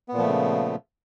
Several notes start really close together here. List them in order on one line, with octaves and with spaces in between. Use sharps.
B3 A#2 F3 A3 C#3